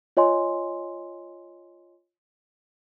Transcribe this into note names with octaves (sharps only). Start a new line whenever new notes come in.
F4 C#5 D#5 G#5 C6